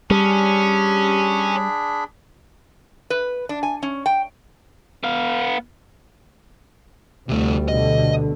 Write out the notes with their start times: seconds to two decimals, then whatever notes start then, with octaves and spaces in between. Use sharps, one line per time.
0.10 G3 C#4 D4 G#4 B5
3.10 B4
3.49 D4
3.63 G#5
3.83 C#4
4.06 G5
5.04 B3 F5
7.29 D2 C3 G3 A3
7.68 B2 D3 D#5